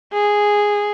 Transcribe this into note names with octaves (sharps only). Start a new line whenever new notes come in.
G#4